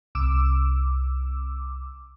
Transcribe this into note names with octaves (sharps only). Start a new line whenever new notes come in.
C2 D6 E6